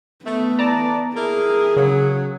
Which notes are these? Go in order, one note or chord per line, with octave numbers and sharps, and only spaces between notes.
A3 B3
E3 D5 A5 A#5
A#3 E4 G#4 A#4
C#3 F#3